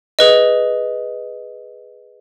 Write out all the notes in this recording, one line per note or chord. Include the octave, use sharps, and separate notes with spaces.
G#4 B4 D#5